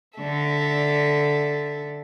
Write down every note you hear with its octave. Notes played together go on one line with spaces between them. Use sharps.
D3 A4 E5